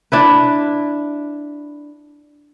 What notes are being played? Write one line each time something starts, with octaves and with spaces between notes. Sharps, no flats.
D4 E4 B4